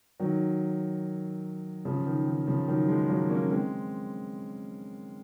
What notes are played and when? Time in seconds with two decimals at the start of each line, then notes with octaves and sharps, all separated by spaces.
0.20 D#3 F#3
1.85 C#3 F3
2.06 D#3
2.27 D#3
2.47 C#3 F3
2.68 D#3 F#3
2.88 F3 G#3
3.09 F#3 A#3
3.30 A#3 C#4
3.51 G#3 C4